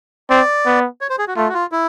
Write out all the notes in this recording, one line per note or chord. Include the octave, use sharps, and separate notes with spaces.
C4 D5
B3
C#5
C5
G#4
F#4
A3 F4
F#4
F4
E4